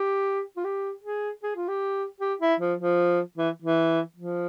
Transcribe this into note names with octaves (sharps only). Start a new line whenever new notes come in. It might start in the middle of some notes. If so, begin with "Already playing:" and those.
Already playing: G4
F4
G4
G#4
G#4
F4
G4
G4
E4
F3
F3
E3
E3
F3